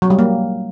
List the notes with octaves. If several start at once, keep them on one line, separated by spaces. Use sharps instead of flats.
F#3
G3
A#3